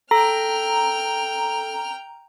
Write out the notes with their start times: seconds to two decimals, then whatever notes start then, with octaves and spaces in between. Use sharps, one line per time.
0.11 A4 G5 A#5 F6